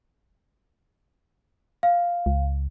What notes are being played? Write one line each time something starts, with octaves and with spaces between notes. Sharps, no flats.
F5
C#2